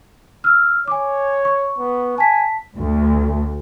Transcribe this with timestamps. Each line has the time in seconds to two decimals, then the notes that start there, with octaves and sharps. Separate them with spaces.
0.44 E6 F6
0.88 C#5 G#5 D6
1.45 C#6
1.78 B3
2.18 G#5 A5 B6
2.78 D2